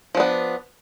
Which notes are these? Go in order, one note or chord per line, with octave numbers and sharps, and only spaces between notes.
F3 B3 D4